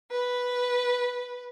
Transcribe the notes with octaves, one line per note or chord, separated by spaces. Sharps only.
B4